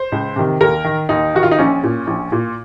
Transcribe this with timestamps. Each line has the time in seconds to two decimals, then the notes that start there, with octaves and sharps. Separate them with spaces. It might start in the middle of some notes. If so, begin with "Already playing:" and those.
Already playing: C5
0.12 C#2
0.36 C3 D#3
0.61 D#2 A#4
0.85 D#3
1.09 D#2 D#4
1.35 D#3 F#4
1.43 F4
1.51 D#4
1.59 A#1 C#4
1.83 A#2
2.07 A#1
2.32 A#2